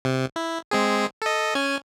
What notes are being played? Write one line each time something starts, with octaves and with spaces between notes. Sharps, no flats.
C3
E4
G#3 C4 G#4
A4 D#5
C#4 G#5